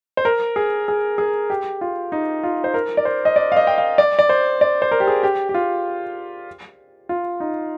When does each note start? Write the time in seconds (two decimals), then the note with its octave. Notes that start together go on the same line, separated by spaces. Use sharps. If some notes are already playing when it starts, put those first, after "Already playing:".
0.17 C5
0.25 A#4
0.56 G#4
0.88 G#4
1.18 G#4
1.50 G4
1.81 F4
2.12 D#4
2.43 F4
2.64 C5
2.74 A#4
2.97 D5
3.05 C5
3.25 D#5
3.36 D5
3.52 F5
3.57 D#5
3.67 G5
3.78 F5
3.98 D5
4.19 D5
4.29 C5
4.61 D5
4.82 C5
4.91 A#4
5.00 G4
5.07 G#4
5.23 G4
5.49 G4
5.54 F4
7.09 F4
7.40 D#4